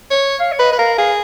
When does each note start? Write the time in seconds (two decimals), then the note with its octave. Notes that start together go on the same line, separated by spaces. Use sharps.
0.11 C#5
0.40 F5
0.52 C#5
0.59 B4 D#5
0.73 B4
0.78 A#4 F5
0.97 G#4 F5